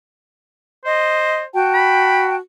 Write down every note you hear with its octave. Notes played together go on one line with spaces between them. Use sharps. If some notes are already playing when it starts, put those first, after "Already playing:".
C5 D#5
F#4 G5 A5
B5